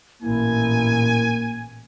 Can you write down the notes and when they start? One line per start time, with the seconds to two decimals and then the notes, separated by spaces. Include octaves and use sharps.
0.22 A1 A#2 A#3 E4 G#5